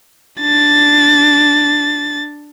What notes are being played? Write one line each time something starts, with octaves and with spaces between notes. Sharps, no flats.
D4 A6